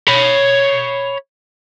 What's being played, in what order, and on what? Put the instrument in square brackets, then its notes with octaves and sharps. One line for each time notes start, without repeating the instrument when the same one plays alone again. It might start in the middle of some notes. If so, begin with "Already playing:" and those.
[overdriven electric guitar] C#5 B5